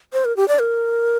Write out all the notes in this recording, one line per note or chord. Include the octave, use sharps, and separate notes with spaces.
C5
A#4
G4
D5
A#4